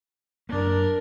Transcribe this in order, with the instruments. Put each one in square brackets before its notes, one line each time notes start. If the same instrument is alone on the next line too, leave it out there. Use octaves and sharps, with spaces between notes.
[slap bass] F#2 A#3 [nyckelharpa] D4 A#4